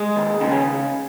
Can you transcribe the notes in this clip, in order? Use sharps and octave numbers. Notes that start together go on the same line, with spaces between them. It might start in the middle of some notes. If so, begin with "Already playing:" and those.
Already playing: G#3
D#2
C#3 D#4
C#4